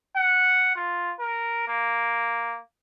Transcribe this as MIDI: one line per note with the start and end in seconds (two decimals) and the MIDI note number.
0.16 0.76 78
0.76 1.12 65
1.20 1.67 70
1.68 2.58 58